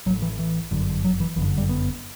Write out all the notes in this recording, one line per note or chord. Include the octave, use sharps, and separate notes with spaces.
A1 A2 F#3
E3
E3
G1 F#2 D3
F#3
E3
G1 F#2 D3 E3
G3
B3